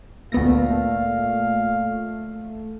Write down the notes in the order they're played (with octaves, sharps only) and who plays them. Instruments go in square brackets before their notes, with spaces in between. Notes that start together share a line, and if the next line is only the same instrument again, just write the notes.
[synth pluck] D2 B3 A#6 [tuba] A#2 [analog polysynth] A3 [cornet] F5